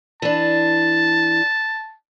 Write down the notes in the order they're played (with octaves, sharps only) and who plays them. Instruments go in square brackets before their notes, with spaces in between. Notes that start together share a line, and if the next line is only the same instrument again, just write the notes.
[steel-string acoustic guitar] E3 D4 [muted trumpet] A5